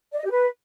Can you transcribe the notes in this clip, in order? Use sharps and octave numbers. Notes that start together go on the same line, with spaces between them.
D5
D#5
G4
B4